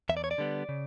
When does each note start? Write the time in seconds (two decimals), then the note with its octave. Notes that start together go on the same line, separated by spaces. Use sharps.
0.09 E2 E5
0.17 D5
0.24 C#5
0.31 D5
0.38 D3 G3 B3
0.69 C#3